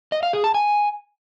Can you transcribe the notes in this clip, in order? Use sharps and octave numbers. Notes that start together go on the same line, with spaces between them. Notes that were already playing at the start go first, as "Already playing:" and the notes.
D#5
F5
G#4
A5
G#5